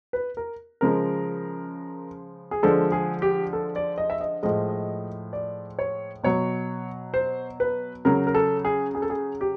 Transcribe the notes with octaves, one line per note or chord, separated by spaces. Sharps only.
B4
A#4
C#3 F3 G#3 A#4
G#4
D3 F3 G#3 A4
G#4
G4
A4
D5
D#5
E5
D#5
A2 F3 G#3 D#5
D5
C#5
B2 F#3 C#5
C5
B4
C#3 F#3 A#4
A#4
A4
G#4
G#4
A4
G#4
G4